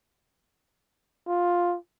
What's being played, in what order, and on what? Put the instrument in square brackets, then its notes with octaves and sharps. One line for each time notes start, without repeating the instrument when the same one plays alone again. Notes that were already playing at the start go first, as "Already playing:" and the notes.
[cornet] F4